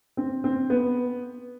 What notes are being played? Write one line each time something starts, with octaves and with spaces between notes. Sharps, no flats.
C4
C4
B3